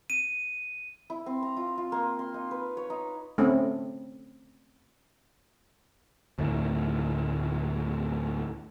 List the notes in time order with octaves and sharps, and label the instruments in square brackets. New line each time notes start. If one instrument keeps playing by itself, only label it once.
[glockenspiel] D#7
[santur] E4
C4
A#5
F4
F4
A#3
C6
D#4
B4
C#5
D#4
[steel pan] A3 C4 C#4
[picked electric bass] D2 A2 D#3